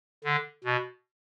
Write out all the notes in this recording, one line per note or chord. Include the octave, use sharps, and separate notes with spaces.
D3
B2